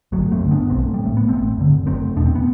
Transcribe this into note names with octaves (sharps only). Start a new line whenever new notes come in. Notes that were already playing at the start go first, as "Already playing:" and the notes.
G1 F#3 A3
A3 C4
G2 D3
B3 D4
B1 A3 C4
G3
A2
A3
B3
A1 A3 C4
G2 D3
F#1 A3 C4
E2 B2 D4
C4
B3